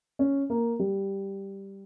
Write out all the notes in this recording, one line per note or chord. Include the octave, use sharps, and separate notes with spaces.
C#4
A#3
G3